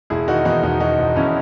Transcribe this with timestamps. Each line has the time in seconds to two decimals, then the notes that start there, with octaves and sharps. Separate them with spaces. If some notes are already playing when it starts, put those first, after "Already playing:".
0.10 E1 E4 G#4
0.28 D#3 D#4 F#4
0.45 E2 D#4 F#4
0.63 E1 D#4 F#4
0.80 D#3 D#4 F#4
0.98 E1
1.16 E1 C#4 E4